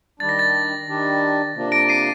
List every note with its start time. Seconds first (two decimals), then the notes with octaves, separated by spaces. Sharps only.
0.20 D#3 G3 D4 A6
0.29 A#6
0.39 A6
0.87 D#3 G3 D4
1.55 C3 F3 A#3 D4
1.72 A#6 D7
1.89 C7 D#7